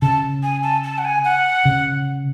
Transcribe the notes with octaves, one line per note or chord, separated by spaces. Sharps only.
C#3 A5
G#5
A5
A5
F#5
G#5
F#5
C#3